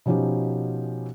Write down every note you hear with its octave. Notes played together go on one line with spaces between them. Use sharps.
B2 F3 C#4 D#4 G4